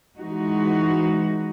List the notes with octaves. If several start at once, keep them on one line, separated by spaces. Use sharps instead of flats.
E3 G#3 D#4 F#4